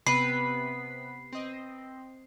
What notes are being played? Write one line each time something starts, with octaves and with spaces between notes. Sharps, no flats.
C3 B3 B4 B6 C7
C4 D#5